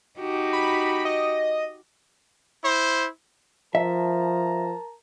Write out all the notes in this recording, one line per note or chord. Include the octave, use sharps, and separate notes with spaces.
D#4 F#4 G4
B5
D#5
E4 C5
F3 A#4 E5 A5 A#5